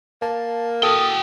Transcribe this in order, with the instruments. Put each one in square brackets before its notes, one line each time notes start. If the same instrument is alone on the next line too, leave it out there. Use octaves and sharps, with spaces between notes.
[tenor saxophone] A#3 [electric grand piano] A5
[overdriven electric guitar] F#4 G5 [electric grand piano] A4 [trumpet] D#6